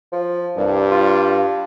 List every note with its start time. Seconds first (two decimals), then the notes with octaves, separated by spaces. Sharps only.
0.12 F3
0.57 C2 G2
0.91 F4